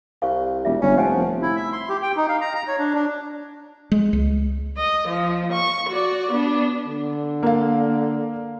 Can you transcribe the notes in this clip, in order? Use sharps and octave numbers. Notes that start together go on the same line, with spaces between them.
C2 F5 C#6
E1 G3 F4 E5
G1 C#4
F1 F3 C5 F#5 G#5
F1
E4
E5
C6
G4
G5
D#4
F5
A#5
A#5
C#5
D4
D4
G#3
C#2
D#5
F3
C#6
F#4 D5
B3 D4
D3
A#3 F5